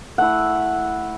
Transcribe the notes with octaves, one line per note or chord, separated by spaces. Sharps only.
A3 E4 F#5